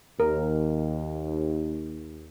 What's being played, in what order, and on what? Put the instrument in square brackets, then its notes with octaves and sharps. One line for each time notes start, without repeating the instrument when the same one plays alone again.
[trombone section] D#2 [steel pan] A#4